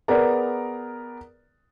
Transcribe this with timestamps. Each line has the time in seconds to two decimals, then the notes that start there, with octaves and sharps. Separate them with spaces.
0.08 B3 G#4 A#4 B4 D5 A#5